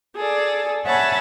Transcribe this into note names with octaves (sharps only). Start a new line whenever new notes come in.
G#4 A4 D5
C#5 E5 F#5 G#5 A5 B5